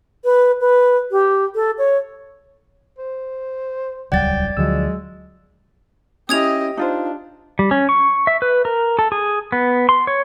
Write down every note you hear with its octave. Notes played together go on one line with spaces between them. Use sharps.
B4
B4
G4
A4
C#5
C5
D#1 C#2 F#3 G3 D5 F#5 G5 A6
D2 D3 F3 F#3 G#3 E6
C#4 E4 G4 D#5 D#6 G#6 F7
D4 D#4 F4 C5
G3
C#4
C#6
E5
B4
A#4
A4
G#4
B3
C6
C#5